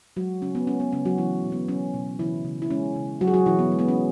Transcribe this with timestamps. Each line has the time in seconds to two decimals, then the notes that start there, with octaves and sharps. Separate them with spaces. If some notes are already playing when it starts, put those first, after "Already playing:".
0.16 F#3 G#3 F#4
0.42 C#3 C#4
0.55 B3
0.67 G#3 C#4
0.80 B3
0.92 C#3 C#4
1.05 F#3 F#4
1.18 E3 G#3 E4
1.44 B2
1.52 B3
1.68 F#3 C#4
1.94 B2
2.19 C#3 E3 E4
2.45 C#3
2.62 E4
2.70 G#3 C#4
2.96 C#3
3.21 F#3 F#4
3.27 G#4
3.34 F#3 F#4
3.46 B2 E3 E4
3.59 B3
3.72 G#3
3.79 B3
3.88 C#4